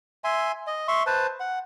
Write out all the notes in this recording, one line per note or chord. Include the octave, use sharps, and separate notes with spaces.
E5 G#5 C6
D#5
E5 C6 C#6
B4 C5 A5
F#5